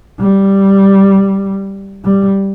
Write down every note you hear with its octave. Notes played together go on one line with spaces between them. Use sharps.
G3
G3